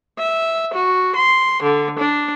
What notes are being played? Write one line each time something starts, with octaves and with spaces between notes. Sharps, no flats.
E5
F#4
C6
D3
D4